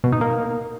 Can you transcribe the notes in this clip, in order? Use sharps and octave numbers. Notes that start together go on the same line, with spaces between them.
B2
D#4
A#3